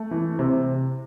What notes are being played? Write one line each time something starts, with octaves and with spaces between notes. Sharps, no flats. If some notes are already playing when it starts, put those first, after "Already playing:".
Already playing: A3
E3
C3